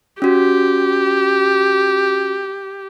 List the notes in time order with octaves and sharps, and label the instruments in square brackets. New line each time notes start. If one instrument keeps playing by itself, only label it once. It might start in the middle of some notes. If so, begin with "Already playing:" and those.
[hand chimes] C#4 F#4 [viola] G4